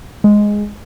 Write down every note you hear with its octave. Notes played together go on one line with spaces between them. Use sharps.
G#3